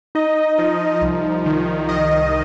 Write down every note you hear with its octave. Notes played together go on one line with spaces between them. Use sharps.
D#4 D#5
F3
C2
D#3
D#3 D#5